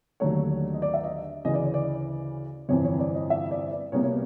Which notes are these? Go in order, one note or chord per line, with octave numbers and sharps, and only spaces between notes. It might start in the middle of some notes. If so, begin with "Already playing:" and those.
D#2 D3 F#3 A3 C#5
D#5
D5
E5
D#5
D2 C#3 E3 D#5
D5
C#5
D5
G1 F2 C3 E3 C#5
C#5
D5
D#5
E5
D5
D5
C2 B2 G3 A#3 C#5
C#5